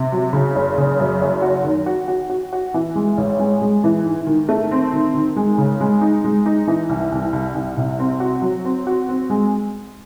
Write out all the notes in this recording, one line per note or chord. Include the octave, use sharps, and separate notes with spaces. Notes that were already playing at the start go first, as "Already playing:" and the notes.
Already playing: C3
F#3
C#3
F#1
C#3
F#2
F#1
F#4
D#3
F#4
F#4
F#4
F#4
E3
G#3
A1
G#3
G#3
E3
G#2
D#3
A3
C4
D#3
D#3
G#3
C#3
G#3
D#4
G#3
D#4
E3
C2
C2
C2
C2
C3
C4
F#4
F#3
C4
F#4
C4
G#3